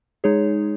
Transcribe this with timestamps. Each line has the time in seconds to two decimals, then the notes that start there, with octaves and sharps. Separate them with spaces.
0.24 G#3 D#4 G#4 C#5